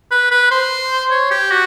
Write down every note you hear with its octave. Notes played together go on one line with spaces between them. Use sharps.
B4
B4
C5
C#5
G4
F#4